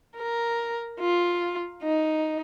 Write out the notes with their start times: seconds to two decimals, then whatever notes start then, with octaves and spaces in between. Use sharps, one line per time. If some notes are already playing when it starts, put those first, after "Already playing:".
0.17 A#4
1.00 F4
1.83 D#4